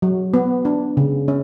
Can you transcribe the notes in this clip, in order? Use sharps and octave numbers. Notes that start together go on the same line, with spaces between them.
F#3
B3
D4
C#3
C#4